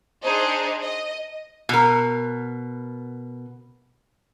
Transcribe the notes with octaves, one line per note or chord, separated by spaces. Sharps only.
D4 D#4 G#4 C5 D#5
D#5
B2 A#4